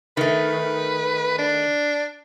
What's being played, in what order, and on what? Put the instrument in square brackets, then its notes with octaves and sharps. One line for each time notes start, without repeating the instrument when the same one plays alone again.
[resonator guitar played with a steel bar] D#3 A3 [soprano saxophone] B4
[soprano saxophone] D4